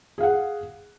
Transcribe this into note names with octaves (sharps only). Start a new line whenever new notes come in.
G#4 F5 F#5